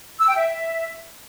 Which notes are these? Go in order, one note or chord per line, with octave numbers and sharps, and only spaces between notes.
E6
G5
E5